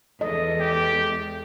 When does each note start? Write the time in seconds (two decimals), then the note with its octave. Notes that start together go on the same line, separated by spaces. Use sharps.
0.21 E2 G#3 A4 D#5
0.60 G4